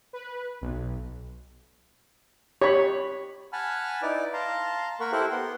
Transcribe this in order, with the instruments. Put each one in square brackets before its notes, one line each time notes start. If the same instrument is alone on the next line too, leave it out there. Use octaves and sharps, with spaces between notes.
[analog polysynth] B4
B1
[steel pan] G4 B5 [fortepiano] C#5
[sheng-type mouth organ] F#5 G#5 A5 B5 F6
D#4 E4 B4 D5 D6
F5 A5 A#5 C6
A#3 A#4 F#5 B5 C#6
E4 G4 A4 A#4 C5 F#6
B3 F#5 C6